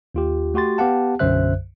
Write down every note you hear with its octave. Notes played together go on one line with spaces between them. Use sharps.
D#2 F4 G4
A3 F#4 G4 C6 A6
B3 G4 F5 F#5 A5
B1 F#2 D3 C5 E5 F#6